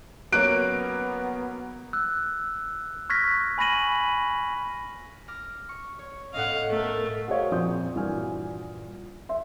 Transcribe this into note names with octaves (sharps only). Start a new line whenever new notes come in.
F#3 A#3 B3 C#4 F#6 D7
E6 F#6
C#6 F6 F#6 G#6 A#6 B6
G#5 B5 C#6 A#6 D#7 F#7
D6 F6 A#6
C#6
C#5
A2 C#4 D#5 F5 F#5
A3 A#4
F#4 G#4 A#4 C5 C#5 F5
F2 A#2 C4 D#6 G6
G2 A#2 E3 F#4 G#5 F6
E5 C6